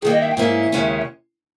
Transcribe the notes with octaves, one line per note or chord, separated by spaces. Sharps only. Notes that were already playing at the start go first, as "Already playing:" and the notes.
G2 D#3 A#3 G#4
D#5
E5
G5
G#2 E3 A#3 C#4 E5
D#2 C#3 G#3 C#4